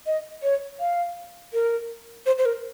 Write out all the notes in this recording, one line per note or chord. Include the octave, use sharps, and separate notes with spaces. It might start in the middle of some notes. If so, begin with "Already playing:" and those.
D#5
C#5
F5
A#4
C5
C5
A#4